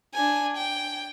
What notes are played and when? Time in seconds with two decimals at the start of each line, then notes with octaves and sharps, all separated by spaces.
0.14 D4 G#5
0.57 G5